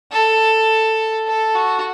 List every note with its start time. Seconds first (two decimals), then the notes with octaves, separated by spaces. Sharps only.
0.12 A4
1.27 A4
1.55 F#4